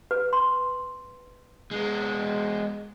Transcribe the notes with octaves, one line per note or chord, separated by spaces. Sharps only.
B4
C6
G#3 B3